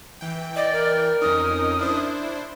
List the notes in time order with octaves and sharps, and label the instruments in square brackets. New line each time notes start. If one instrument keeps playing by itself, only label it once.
[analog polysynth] E3 G5
[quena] D5 [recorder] D#5
[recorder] A#4
[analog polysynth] F2 C#4 D#4 [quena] D#6
[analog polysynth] D4 E4 C5